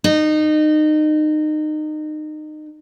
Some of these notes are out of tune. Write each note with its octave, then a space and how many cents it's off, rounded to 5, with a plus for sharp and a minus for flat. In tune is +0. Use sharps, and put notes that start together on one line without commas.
D#4 -25